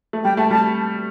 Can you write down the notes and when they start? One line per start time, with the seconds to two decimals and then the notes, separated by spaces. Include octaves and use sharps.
0.13 A3
0.24 G3 G5
0.37 A3 A5
0.51 G3 A5